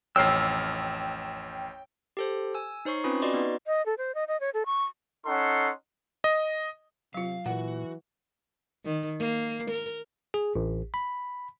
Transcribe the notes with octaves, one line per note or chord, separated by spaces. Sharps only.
A1 F2 C#5 G5 E6 F6 C7
G4 A4 C5
G#5 E6
D#4 C5 C#5 C#6 C7
C4 C#4 F4 B4 B5 D#6
F#4 D5 D#5 C6 D6
B3 D#4 B4
D#5
A4
C5
D#5
D#5
C#5
A4
C#6
C#4 D#4 A4 F#5 C6
D#5
C3 F#3 F4 F5
A#2 E3 F#4 F#5
D#3
A#3
A#4
G#4
A1
B5